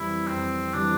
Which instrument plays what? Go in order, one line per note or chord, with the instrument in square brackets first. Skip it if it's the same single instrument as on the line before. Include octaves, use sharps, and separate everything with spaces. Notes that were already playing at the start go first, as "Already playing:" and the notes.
Already playing: [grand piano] F2 E3 G3 [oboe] E4
[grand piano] F2 [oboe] C4
[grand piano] E3 G3 [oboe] D4